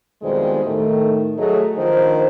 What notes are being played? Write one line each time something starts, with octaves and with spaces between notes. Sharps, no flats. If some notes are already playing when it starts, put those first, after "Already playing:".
F2 B2 D#3 G3 G#3 C5
A2 D#3 A3
F#3 A3 G#4 C#5 D#5
D#3 F3 D4 C5